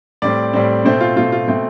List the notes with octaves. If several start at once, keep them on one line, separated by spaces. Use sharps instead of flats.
A2 G3 C4 D5
A2 G3 C4
B2 A3 C4 C5
F4
B2 A3 C4 F4
F4
B2 A3 C4